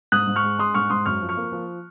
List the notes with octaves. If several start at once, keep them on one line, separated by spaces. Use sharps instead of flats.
G#2 D#6 F#6
G#2
C#6 F6
G#3
G#3 C6 D#6
G#2 C#6 F6
G#2 C6 D#6
F#2 C#6 F6
F3
C#6 F6
A#3
F3